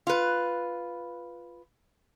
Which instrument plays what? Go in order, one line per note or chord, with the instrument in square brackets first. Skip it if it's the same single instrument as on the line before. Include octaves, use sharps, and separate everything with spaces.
[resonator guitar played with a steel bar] F4 B4